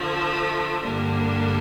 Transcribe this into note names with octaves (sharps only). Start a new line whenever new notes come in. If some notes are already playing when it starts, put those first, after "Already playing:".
Already playing: D3 F3 A3
G2 D3 G3 A#3 D4